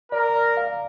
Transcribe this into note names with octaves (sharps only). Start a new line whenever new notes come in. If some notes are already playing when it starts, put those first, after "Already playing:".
A#4 D5
F5